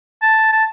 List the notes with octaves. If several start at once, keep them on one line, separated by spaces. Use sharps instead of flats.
A5
A5